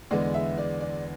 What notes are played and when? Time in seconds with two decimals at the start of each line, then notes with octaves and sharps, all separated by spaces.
0.11 E2 D3 G#3 B3 D5
0.34 E5
0.58 D5
0.80 D5